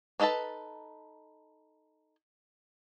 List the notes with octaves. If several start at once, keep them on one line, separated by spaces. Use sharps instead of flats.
D4 D#4 A4 B4 A5